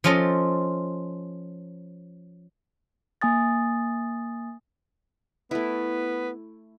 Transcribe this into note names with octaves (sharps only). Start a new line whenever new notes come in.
F3 C#4 F4 A4 D#5
A#3 G#5 D#6 A6
A3 B3 E4